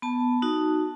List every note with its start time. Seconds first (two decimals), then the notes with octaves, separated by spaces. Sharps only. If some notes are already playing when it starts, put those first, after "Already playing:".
0.02 B3 A5
0.42 D#4 F#4